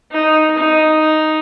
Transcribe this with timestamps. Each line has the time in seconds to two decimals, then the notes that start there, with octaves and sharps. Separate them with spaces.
0.12 D#4
0.57 D#4